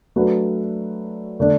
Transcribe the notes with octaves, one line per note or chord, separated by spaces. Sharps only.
F#3 A3 D4 F#4 B4
D3 A3 D4